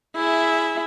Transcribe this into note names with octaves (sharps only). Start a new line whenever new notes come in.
E4 G#4 E5